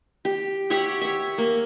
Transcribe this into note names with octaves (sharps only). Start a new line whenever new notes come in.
G4
G4 C#5 E5 F#5
C#5 E5
A#3